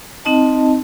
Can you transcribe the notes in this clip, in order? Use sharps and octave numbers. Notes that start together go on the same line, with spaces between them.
C4 D#4 D#5 A5